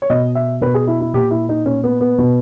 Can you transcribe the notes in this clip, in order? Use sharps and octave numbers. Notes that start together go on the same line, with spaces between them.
C#5
B2 D#5
E5
B2 B4
G#4
E4
E4
A#2 G4
E4
D#4
A#2 C#4
B3
B3
B2